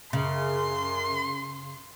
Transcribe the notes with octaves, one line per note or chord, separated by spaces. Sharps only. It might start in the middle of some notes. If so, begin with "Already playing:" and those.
F#2 C#3 C6